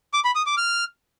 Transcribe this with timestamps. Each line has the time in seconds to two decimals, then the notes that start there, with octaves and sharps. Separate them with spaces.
0.13 D6
0.24 B5
0.35 D#6
0.46 D6
0.57 F6